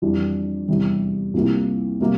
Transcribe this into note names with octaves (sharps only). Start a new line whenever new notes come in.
F2 E3 G3 D4
E2 C3 G3 C4 E4
C2 C3 F3 A#3 E4
C3 G3 A#3